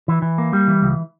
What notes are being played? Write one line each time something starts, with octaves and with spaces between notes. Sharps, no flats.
E3
E3
A#3
G3
E3
C#2